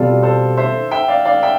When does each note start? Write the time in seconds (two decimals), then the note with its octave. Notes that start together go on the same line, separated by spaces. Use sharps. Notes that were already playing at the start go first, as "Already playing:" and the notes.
Already playing: B2 G3 C4 F4 G4 A4 D5
0.23 A4 C5
0.57 C5 E5
0.91 E5 G5
1.08 D5 F5
1.25 D5 F5
1.43 E5 G5